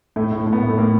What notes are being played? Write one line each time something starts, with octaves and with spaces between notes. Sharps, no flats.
A2 A3
A2
A3
A2
B3
A#3
A2
A3
A2 A#3